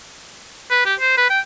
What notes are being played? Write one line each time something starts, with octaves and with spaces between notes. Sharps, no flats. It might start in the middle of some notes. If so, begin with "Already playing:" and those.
B4
G4
C5
B4
G5